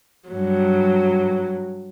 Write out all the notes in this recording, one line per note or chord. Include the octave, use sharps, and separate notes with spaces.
G2 F#3